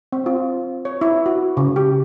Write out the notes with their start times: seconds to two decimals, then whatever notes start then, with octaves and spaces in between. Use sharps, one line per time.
0.12 C4
0.26 F4
0.85 C#5
1.01 E4
1.26 F#4
1.57 C#3
1.76 G4